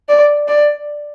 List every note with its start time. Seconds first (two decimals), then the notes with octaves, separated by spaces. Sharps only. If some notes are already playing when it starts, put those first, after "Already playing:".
0.09 D5
0.48 D5